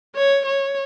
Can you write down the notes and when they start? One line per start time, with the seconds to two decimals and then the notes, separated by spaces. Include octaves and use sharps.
0.16 C#5
0.46 C#5